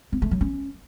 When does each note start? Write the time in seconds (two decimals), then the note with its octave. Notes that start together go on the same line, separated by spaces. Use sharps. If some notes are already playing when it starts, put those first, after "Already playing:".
0.12 C4
0.22 A3
0.31 F#3
0.41 C#4